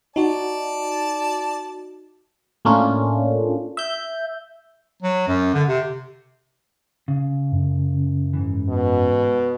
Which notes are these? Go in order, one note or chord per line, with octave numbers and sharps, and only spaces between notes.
D#4 F#4 D5 A5
A2 A3 A#3 C#4 D4 F4
E5 G6
F#3
F#2
D3
C3
C#3
F#2
G#2 E3
B2